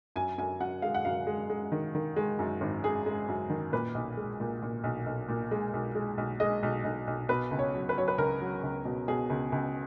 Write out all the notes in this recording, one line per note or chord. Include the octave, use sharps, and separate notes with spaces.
F#2 G#5
F#2 G#5
F#2 F#5
G#3 F5
F#5
F#2 F5
G#3
G#3
D#3
D#3
G#3
F#2
G#1
G#3 G#4
G#3
F#2
D#3
A#2 B4
B1
G#3
A#2
A#2
B1
B1
A#2
G#3
B1
G#3
B1
G#3 D#5
B1
B1
B1
B2 B4
C#2
C#5
F#3
B4
F#3 C#5
B4
C#2 A#4
F#3
C#2
B2
B2 G#4
C#2
C#2